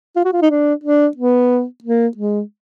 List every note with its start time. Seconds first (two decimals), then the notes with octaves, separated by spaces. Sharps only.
0.16 F4
0.25 F#4
0.33 F4
0.42 D#4
0.50 D4
0.84 D4
1.17 B3
1.84 A#3
2.17 G#3